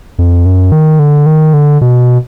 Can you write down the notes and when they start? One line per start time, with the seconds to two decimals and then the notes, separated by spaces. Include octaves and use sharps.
0.19 F2
0.46 F#2
0.72 D#3
0.99 D3
1.26 D#3
1.54 D3
1.81 B2